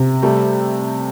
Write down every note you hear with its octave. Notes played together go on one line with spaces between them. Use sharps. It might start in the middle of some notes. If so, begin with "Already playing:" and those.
Already playing: C3
G3 A3